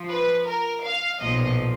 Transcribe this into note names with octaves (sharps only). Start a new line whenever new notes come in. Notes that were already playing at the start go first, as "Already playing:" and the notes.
Already playing: F3
B4
A#4
F5
B1 A#2 F3 D#5